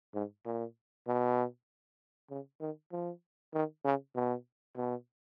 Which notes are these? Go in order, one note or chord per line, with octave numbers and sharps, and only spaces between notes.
G#2
A#2
B2
C#3
D#3
F3
D#3
C#3
B2
B2